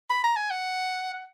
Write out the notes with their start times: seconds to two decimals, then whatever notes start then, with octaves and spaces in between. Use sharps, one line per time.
0.10 B5
0.24 A#5
0.36 G#5
0.50 F#5
1.13 F#5